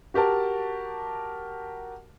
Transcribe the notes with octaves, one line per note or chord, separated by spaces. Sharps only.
F#4 G4 A#4 A5